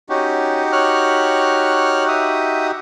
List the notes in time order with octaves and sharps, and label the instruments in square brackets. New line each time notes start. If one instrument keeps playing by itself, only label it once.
[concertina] C#4 [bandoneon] D#4 F#4 G4
[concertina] C#5 F6 F#6
E5 D#6